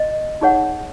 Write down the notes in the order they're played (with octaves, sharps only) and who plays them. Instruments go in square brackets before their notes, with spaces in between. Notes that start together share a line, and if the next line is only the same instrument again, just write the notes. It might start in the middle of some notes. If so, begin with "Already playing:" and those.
Already playing: [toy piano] D#5
D#4 G#4 C#5 F#5